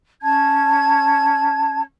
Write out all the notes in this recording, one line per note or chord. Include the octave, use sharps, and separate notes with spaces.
C#4 A5 G#6